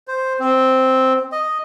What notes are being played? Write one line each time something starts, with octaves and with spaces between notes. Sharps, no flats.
C5
C4
D#5